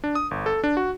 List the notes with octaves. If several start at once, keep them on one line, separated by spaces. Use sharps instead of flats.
D4
D#6
G1
A4
D4
F#4